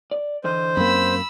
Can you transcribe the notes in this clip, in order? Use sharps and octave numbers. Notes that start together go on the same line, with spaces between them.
D5
D3 E3 C5 D#5
F#2 A#3 C4 B5 E6